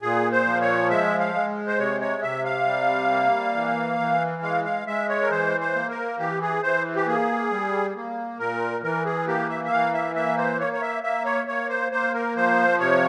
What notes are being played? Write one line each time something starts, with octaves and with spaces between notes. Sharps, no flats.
A#2 G#4
C5
F3
C#5
G#3 E5
F5
G#3
C5
C3 C#5
C#5
C3 E5
F5
G3
A#3
E3
E3
G#3 F5
F5
G#3 E5
C#5
A#4
E3 C5
C5
A#3
A#4
E3 G4
G#4
E3 C5
G4
A#3 G#4
G3
A#3
A#2 A#4
E3 A#4
G#4
A#3 G4
E5
E5
E3 F5
E5
A#3 E5
C5
A#3 C#5
C#5
E5
A#3 E5
C#5
A#3 C#5
C5
A#3 C5
A#4
F3 C5
C3 C#5